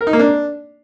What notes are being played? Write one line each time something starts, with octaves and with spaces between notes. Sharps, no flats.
A#4
D#4
A#3
D4